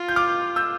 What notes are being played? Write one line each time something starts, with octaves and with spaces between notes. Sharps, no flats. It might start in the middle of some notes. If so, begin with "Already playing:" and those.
Already playing: F4
G6
D6 F6
E6 G6